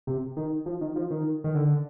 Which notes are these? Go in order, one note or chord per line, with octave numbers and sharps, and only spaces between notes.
C3
D#3
F3
D#3
F3
D#3
D#3
D3